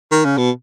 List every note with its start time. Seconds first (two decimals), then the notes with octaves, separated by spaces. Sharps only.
0.11 D#3
0.25 C#3
0.37 B2